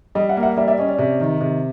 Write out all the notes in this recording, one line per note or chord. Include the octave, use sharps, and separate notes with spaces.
G3 D#5
E5 F#5
A#3
E5 F#5
G3 D5 E5
D5 E5
C#4 D#5
D5
C3
D#3
C3